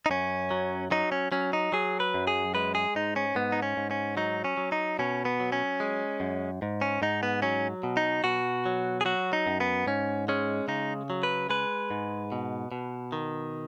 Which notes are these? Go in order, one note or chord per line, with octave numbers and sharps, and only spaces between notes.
D#4
F#2 C#4
F#3
F#3 D#4
C#4
F#3 C#4
D#4
F#3 G#4
B4
F#2
G#4
G#3 B4
G#4
G#2 D#4
C#4
G#2 B3
D#4
C#4
G#2
C#4
F#3 D#4
C#4
F#3
D#4
B2 C#4
B3
F#3
C#4
G#3
F#2
G#2
C#4
G#2 D#4
B3
F#3 C#4
B2
D#4
B2 F#4
F#3
G#4
F#3 F#4
D#4
F#2
B3
G#2 C#4
G#3 C#4
C#3 D#4
F#3
B4
G#3 B4
G#2
B2
B2
D#3